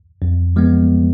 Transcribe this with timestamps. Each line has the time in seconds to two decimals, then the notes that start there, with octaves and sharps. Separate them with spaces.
0.22 F2
0.56 F3 G#3 B3